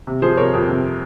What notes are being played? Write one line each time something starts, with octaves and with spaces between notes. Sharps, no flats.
C3
F3 G#4 C5
C3 A#4 C#5
F2
C3